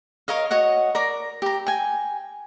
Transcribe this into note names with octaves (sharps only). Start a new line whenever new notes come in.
A#4 C#5 D#5 F5
F#4 C#5 D#5 F#5
A#4 D5 A#5
G4 A#5
G5 G#5